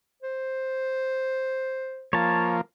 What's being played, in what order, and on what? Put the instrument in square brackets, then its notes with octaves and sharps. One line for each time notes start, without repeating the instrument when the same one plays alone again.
[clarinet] C5
[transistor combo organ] F3 A#3 [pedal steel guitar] C#5 A5